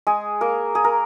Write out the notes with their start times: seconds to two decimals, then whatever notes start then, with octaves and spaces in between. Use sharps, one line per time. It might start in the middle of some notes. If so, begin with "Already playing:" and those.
0.07 G#3 G#4
0.41 A#3 A#4
0.75 G#4
0.84 A#4